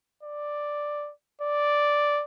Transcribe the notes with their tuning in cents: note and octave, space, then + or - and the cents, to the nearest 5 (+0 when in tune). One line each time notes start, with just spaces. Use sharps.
D5 +5
D5 -5